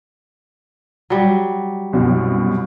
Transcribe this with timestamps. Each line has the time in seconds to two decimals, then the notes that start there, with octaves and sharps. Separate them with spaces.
1.10 F#3 G3
1.93 C2 F#2 B2